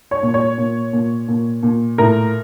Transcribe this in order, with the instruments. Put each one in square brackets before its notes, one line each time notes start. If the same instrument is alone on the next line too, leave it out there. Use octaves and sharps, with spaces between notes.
[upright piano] C#5
A#2
C#5
A#2
A#2
A#2
A#2
A2 A#4